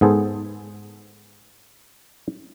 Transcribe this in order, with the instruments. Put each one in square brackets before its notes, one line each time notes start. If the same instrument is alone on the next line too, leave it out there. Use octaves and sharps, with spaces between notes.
[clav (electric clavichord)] G#2 B3 G#4 A4 C5